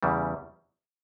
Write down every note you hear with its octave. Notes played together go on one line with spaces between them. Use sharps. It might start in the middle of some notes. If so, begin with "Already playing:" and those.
E2 C#3 E3 G3